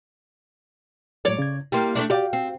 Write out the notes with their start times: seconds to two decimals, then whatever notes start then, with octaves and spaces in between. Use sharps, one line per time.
1.25 A2 F#3 G#3 C#5 D5
1.39 C#3 G#6
1.72 G3 A#3 E4 G5 C6
1.95 A3 A#3 D4
2.10 F#4 G4 D5 F5 G5
2.33 C4